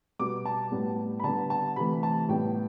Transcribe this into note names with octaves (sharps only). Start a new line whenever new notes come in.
B2 G3 B3 D6
A5
A2 G3 B3
B5
D3 G3 B3 A5
A5
C3 E3 A3 B5
A5
A2 G3 B3 G5